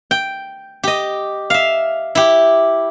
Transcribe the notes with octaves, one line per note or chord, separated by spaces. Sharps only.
G5
G4 D#5
E5 F5
E4 G4